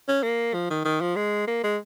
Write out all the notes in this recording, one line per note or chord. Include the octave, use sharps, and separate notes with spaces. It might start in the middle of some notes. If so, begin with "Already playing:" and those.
C#4
A#3
F3
D#3
D#3
F3
G#3
A#3
G#3